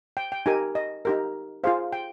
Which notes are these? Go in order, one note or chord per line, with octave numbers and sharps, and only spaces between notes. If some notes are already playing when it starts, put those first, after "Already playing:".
G5
G5
D#4 G4 A#4 G#5
D#5
D#4 G4 A#4
F4 G#4 C5 F5
G5